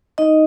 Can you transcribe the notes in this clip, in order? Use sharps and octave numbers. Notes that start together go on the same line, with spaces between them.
D#4 D#5